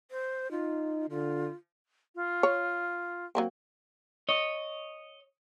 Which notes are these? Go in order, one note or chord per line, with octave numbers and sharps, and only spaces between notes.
C5
D#4 F4
D3 F4
F4
C#5
F#3 A#3 C4
C#5 D#5